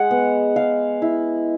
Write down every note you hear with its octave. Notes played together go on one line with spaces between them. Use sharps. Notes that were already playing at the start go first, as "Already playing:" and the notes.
Already playing: G#3 F#5
B3
G#3 F5
E4